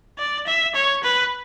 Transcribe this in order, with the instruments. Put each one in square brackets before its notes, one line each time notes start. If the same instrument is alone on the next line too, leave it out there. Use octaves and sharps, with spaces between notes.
[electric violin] D5
E5
C#5
B4